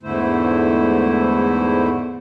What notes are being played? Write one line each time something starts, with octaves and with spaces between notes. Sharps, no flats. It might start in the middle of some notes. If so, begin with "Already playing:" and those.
E2 G#2 D3 A3 E4 C5